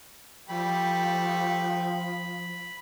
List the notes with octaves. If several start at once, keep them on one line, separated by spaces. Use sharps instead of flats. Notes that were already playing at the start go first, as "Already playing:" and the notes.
F3 G3 A3 G5 B5